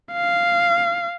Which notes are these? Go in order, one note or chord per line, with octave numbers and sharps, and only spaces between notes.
F5